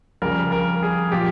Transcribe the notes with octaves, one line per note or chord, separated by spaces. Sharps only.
F2 C#3 G3 A#4
A#4
G#4
A#2 F3 G4